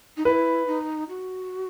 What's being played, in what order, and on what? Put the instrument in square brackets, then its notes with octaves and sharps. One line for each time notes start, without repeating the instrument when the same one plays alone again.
[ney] D#4
[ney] E4 [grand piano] B4
[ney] D#4
F#4